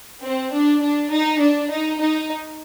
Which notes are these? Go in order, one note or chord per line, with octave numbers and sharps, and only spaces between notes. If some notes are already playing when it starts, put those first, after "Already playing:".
C4
D4
D4
D#4
D4
D#4
D#4